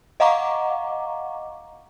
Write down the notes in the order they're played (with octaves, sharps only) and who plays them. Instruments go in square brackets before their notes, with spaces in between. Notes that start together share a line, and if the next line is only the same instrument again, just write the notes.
[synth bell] D#5 F5 F#5 A#5 C#6 D6